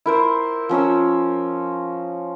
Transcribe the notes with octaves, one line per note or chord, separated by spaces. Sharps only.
E4 A#4 C5
F3 C#4 A#4 E6